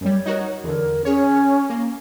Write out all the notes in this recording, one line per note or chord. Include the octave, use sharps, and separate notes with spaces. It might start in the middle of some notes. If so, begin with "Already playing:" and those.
F#2 G3 C#5
D#4 F#4 A#4
E2 D3 A#4
C#4 G#4 C#5
A#3